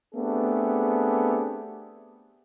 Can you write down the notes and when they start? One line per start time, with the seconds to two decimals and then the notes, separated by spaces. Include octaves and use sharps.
0.15 A3 B3 C4 D4 G4 G#4